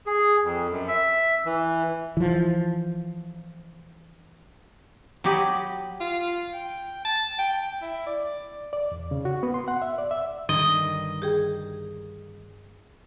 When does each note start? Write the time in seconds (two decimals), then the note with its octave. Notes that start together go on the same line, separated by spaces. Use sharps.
0.06 G#4
0.44 F2
0.70 F#2
0.88 E5
1.46 E3
2.17 E3 F3
5.24 F#3 G4 D#5 B5
6.00 F4
6.53 G5
7.05 A5
7.39 G5
7.82 E4
8.06 D5
8.73 D5
8.92 E2
9.11 C#3
9.25 F#4
9.43 B3
9.54 C6
9.68 F#5
9.82 E5
9.98 D5
10.11 E5
10.49 G2 D3 D#3 D#5
11.22 G4 G#4 G5